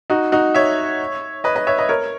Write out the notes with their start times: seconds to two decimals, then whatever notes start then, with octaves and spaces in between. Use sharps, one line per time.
0.10 D#4 F#4
0.32 D#4 F#4
0.55 C#5 E5
1.44 B4 D#5
1.56 B4 D#5
1.67 C#5 E5
1.78 B4 D#5
1.89 A#4 C#5